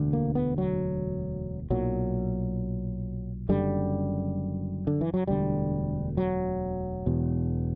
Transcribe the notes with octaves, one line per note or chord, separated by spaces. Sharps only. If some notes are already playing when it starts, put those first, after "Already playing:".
Already playing: E1 D2 D3
A#3
B3
F#3
B1 A#2 F#3
F#1 F#2 D3 G3
D3
E3
F#3
E1 D2 D3 G3
F#3
E1 E2 B2